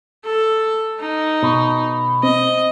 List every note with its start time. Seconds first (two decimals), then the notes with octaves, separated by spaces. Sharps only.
0.25 A4
1.00 D#4
1.43 B2
2.23 C4 D#5